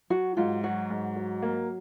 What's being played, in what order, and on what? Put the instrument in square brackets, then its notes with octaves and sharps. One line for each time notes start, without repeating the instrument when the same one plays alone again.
[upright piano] F#3 [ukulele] F#4
[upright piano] G#2 [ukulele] F4
[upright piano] F#3 [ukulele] F#4
[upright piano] G#2
F#3
A#3